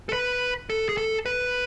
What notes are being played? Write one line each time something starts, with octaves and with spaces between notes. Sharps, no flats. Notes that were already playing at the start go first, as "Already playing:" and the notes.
A4
B4
A4
G#4
A4
B4